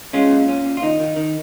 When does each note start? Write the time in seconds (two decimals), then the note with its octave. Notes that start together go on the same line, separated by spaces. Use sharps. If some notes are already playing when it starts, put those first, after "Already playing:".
0.13 G#3 C#4 F4
0.31 A#2
0.48 C#4
0.65 A#2
0.77 F4
0.82 D#3 D#4
1.00 D#3
1.16 D#3